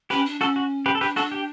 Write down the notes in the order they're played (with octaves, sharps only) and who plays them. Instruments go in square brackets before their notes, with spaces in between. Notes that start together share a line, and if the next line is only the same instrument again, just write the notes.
[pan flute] C#4 [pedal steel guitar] G4 B4
[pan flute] D4
[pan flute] C#4 [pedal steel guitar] F#4 A4
[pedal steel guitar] F#4
G4 B4
A4
[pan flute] D4 [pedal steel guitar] G4 B4
[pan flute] D4 [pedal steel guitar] F#4 A4
[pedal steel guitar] G4